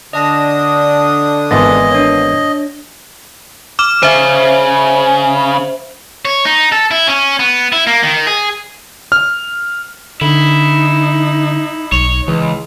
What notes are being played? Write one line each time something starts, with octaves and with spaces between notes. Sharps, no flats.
D3 D4 D#5 A5 D#6 A#6
G#1 E3 B3 D#5 G#5 C6 A6
D4 C#5
D6 F6 E7
C#3 C5 E5
C#5
D#4
A4
E4
C#4
B3
E4
A#3
D#3
G#4
F6
D3 D#4 E4
B1 C#5
C#2 E3